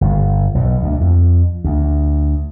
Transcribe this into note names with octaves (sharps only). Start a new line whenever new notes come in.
G1
B1
D2
F2
D2